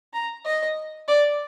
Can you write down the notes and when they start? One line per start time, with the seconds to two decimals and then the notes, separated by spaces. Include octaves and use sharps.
0.13 A#5
0.46 D#5
1.08 D5